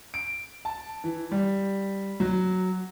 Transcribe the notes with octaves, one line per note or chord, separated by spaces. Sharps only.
D7
A5
E3
G3
F#3